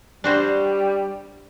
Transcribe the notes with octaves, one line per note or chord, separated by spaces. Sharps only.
G3 D4 F#4 C5